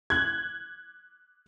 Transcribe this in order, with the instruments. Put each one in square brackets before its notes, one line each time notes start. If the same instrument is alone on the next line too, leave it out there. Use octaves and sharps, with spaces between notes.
[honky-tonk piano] F#6 G#6